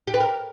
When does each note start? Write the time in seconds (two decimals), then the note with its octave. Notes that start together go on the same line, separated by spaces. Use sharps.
0.07 G4
0.14 B4
0.20 A#4